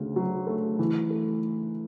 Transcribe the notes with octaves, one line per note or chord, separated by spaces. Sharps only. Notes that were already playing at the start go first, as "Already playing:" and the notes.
Already playing: D2 C#3 A3
F#3
A3
E3
A3